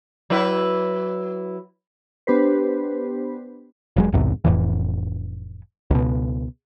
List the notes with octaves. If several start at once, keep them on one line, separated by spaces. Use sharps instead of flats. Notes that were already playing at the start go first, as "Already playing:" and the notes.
F#3 E4 B4
B3 D4 G4 B4 C5
E1 F#3 G#3
B1 E2 G#2 C3
F1 F2 A2 E3
C#2 B2